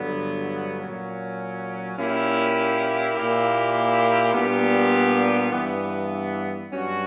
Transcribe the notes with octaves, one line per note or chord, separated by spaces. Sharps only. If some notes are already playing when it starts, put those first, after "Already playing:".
Already playing: G2 D3 F#3 B3
A#2 F#3 C#4
A#2 A#3 C#4 E4 G4
A#2 A#3 E4 G4
A#2 G3 B3 D4 G4
G2 E3 B3
G2 F#3 C#4 F#4